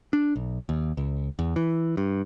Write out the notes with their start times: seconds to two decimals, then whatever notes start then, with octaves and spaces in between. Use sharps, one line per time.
0.13 D4
0.36 B1
0.69 D#2
0.97 C#2
1.39 E2
1.56 E3
1.97 G2